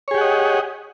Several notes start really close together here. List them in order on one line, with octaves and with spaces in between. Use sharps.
C#5 G#4 G4 F#5 D#5